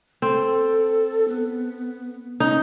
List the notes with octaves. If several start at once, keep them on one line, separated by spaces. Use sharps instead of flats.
C4 A4
B3
C#4 D#4